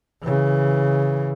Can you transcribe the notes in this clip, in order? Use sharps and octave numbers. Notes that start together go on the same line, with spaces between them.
C#3 E3